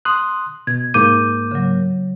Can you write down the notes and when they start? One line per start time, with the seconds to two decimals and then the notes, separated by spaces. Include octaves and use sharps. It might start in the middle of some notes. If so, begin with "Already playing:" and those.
0.05 C6 D#6 F#6
0.67 B2 G#6
0.94 G#2 A#3 D6 G6 D#7
1.51 C#3 F#3